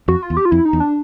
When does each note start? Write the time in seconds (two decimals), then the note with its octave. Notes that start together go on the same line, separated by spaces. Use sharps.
0.08 F2 F#4
0.23 F4
0.30 E2
0.37 G4
0.45 F4
0.51 F2 E4
0.65 D#4
0.73 E2
0.80 D4